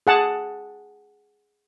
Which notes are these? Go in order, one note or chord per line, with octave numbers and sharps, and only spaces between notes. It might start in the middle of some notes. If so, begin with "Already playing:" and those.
G#4 F#5 A5